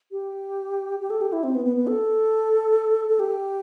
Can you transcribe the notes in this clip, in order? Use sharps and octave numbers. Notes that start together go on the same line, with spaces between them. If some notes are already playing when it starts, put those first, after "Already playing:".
G4
G4
A4
G4
E4
C4
B3
B3
B3
A4
A4
G4